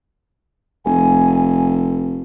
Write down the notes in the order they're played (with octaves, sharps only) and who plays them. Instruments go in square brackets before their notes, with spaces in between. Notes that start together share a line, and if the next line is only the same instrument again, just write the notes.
[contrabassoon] F1 [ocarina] G#5